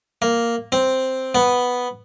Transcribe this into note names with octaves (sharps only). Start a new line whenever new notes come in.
A#3
C4
B3